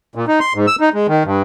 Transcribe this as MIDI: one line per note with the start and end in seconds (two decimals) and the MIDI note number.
0.15 0.25 46
0.28 0.39 63
0.40 0.53 84
0.55 0.66 44
0.67 0.76 88
0.80 0.89 63
0.94 1.07 56
1.08 1.23 51
1.25 1.42 43